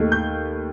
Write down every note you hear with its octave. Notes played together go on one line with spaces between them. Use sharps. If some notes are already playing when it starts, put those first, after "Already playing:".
Already playing: D#2 D#3 A3
G6